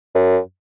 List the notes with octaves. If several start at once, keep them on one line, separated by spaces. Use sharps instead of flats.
F#2